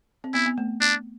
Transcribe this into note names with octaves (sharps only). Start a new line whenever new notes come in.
C4
B3 E4
B3
A3
D4